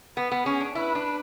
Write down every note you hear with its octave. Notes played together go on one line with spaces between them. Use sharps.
B3 B4
B3
C#4 G#4
D4
E4 B4
D4